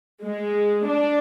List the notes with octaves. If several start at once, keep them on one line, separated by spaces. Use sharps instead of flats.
G#3
D4